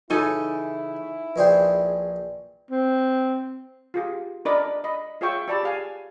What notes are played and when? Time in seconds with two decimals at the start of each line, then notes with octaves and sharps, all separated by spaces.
0.10 C#3 E3 D#4 E4 A4 G#5
1.36 A#1 G#4 B4 C5 D5 G5
2.71 C4
3.94 F4 G4 G#4
4.45 D4 A#4 D5 D#5 B5 D6
4.84 D#5 B5
5.21 F4 G#4 C#5 E5 G5 C#6
5.48 G4 D5 A5 B5
5.63 G#4 F5 G#5